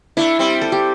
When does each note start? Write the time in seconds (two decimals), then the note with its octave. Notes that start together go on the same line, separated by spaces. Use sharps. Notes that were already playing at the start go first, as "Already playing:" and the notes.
0.17 A3 D4 E4
0.39 G3 C4
0.61 A4
0.72 G4